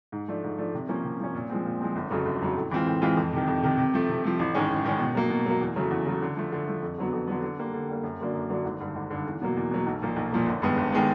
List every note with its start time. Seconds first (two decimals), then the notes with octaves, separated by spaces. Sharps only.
0.12 G#2
0.28 F3 A3 D4
0.44 G#2
0.58 F3 A3 D4
0.74 C3
0.89 F3 A#3 C#4
1.04 C3
1.20 F3 A#3 C#4
1.34 A#2
1.50 F3 G#3 C4
1.65 A#2
1.81 F3 G#3 C4
1.95 G1
2.10 F2 C#3 F#3 A3
2.25 G1
2.41 F2 C#3 F#3 A3
2.57 A2
2.71 E3 G#3 C4 F4
2.86 A2
3.02 E3 G#3 C4 F4
3.17 F2
3.33 C3 D#3
3.47 F2
3.63 C3 D#3
3.77 C3
3.94 F3 A3
4.09 C3
4.24 F3 A3
4.39 A1
4.54 G#2 D#3 G#3 C#4
4.70 A1
4.84 G#2 D#3 G#3 C#4
4.99 B2
5.15 F#3 A#3
5.30 B2
5.46 F#3 A#3
5.61 E2
5.76 C#3 F#3 A3
5.90 E2
6.06 C#3 F#3 A3
6.22 D3
6.36 F3 A3
6.52 D3
6.67 F3 A3
6.82 F2
6.98 D3 F#3 B3
7.13 F2
7.27 D3 F#3 B3
7.43 D3
7.58 G3 A#3
7.74 D3
7.89 G3 A#3
8.03 F#2
8.19 D3 F#3 A#3 D4
8.34 F#2
8.50 D3 F#3 A#3 D4
8.65 G#1
8.80 G2 D3
8.96 G#1
9.10 G2 D3
9.26 E2
9.41 B2 F#3 A#3
9.57 E2
9.71 B2 F#3 A#3
9.86 B1
10.02 A#2 F3 A#3
10.16 B1
10.32 A#2 F3 A#3
10.47 G1
10.62 G2 D#3 G#3 B3
10.77 G1
10.92 D#3 G#3 B3